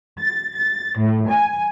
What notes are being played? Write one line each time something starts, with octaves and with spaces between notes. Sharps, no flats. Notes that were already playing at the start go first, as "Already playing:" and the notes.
A6
A6
A2
G#5